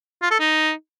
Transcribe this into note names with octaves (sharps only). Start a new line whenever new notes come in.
F4
A4
D#4